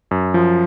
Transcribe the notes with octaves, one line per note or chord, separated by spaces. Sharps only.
F#2
F3